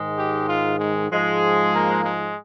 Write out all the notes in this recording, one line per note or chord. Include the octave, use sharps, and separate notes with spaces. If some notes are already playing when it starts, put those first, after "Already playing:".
Already playing: G#2 D#3 G#3
G4
F4
G#3
G#2 F3 G#3
A#3
G#3